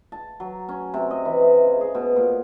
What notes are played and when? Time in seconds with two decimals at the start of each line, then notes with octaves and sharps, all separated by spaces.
0.12 A5
0.40 F#3
0.69 C#4
0.94 C3
1.11 D#5
1.25 E3
1.42 D#5
1.64 C#3
1.81 G#4
1.95 B2
2.16 A#2